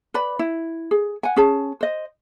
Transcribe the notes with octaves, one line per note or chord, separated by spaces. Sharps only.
B4 D5 B5
E4
G#4
F#5 G#5
C#4 G#4 A5
C5 D#5